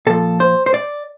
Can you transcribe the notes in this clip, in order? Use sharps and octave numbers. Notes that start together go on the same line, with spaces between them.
A#2 F3 A4
C5
C5
D5